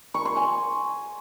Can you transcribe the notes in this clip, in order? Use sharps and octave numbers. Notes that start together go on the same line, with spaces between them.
C#6
C6
G#5